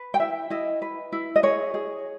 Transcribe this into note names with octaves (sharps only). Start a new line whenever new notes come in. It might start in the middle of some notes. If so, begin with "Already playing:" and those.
Already playing: B4
G5
E4 E5
E4 D#5
B4
E4
D#5
G#4 C#5
G#4